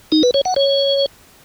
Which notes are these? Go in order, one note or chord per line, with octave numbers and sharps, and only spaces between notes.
D#4
B4
C#5
F#5
C#5